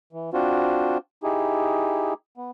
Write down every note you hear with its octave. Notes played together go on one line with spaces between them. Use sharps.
E3
C4 D4 F4 F#4 C5
D#4 E4 G4 G#4
B3